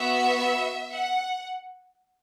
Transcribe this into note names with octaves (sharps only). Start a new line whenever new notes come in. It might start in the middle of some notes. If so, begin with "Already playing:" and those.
Already playing: B3 F#4 E5
F#5